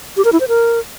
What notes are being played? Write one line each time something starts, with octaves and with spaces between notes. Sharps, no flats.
G4
A#4
E4
C5
A#4